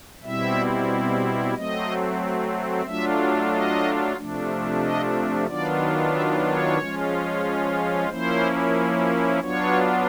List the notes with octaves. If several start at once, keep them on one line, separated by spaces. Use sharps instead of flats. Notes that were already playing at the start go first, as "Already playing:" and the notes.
B2 G3 C4 E4 E5
F#3 A3 C4 D#5
F#3 A3 D4 F4 E5
D#5
C3 F3 A3 D4
D#5
D#3 F#3 B3 D4 F4 D5
E5
C#5
F3 G#3 C#4 F4
F3 A#3 C#4 E4 C5
F#3 B3 D4 F4 C#5